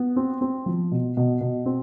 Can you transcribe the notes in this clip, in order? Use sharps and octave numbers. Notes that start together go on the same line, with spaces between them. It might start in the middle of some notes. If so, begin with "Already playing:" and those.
Already playing: B3
C4
C4
F3
B2
B2
B2
C4